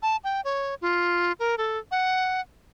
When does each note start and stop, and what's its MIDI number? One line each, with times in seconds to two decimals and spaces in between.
0.02 0.16 81
0.24 0.41 79
0.45 0.75 73
0.81 1.32 65
1.40 1.55 70
1.58 1.78 69
1.91 2.41 78